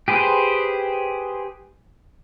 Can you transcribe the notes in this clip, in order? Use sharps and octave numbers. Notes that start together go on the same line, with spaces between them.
G4 G#4 B4 C5